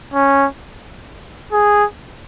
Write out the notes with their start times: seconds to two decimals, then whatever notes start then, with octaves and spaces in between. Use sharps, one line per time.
0.14 C#4
1.52 G#4